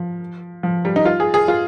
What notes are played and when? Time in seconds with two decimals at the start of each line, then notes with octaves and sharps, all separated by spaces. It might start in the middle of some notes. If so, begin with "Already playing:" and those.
Already playing: F3
0.63 F3
0.85 G3
0.96 D#4
1.05 F4
1.20 G#4
1.34 G#4
1.48 F4